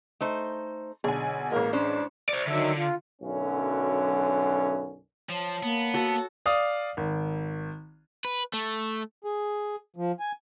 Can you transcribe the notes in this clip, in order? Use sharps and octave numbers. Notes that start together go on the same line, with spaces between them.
A3 D#4 C5
B1 D3 G#4 G#5
A1 G#3 A#3
C#4 D4 C5
C5 D5
D3 D#3 F#3 E5
F4
B1 F#2 D3 C#4
F3 C#5 A5
A#3 B3
F#4 A4
D5 F5 D#6
G#1
B4
A3
G#4
F3
G#5